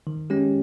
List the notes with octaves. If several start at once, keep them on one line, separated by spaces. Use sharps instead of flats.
D#3
G#3 C#4 G4